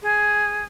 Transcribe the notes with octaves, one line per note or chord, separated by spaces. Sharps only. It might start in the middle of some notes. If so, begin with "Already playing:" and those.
G#4